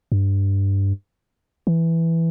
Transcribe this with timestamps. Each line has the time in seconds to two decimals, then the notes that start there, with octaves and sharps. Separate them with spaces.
0.12 G2
1.67 E3